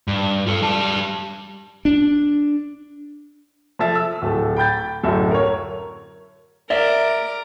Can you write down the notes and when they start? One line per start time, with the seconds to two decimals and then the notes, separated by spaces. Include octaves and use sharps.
0.08 G2
0.47 F4 A4
0.62 G3 A5
1.85 D4
3.79 F3 A4 E5 A6
3.95 E6
4.22 D1 A3
4.57 G5 B5 G6 A6
5.04 D1 F#2 A4 E5
5.31 A#4 C#5
6.70 A#4 D5 E5 D6